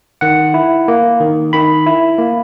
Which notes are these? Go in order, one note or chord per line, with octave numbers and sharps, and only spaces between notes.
D#3 F#5
E4
A#3
D#3
D#3 B5
E4
A#3